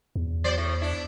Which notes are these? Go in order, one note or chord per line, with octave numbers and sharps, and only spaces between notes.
E2
F#3 C5 D5
A2
D4 E4